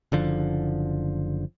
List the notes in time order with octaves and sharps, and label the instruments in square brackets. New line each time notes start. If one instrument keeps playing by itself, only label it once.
[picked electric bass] F#1 D3 F3